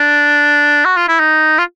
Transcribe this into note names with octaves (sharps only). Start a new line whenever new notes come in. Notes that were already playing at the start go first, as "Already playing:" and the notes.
Already playing: D4
F#4
F4
E4
D#4
F4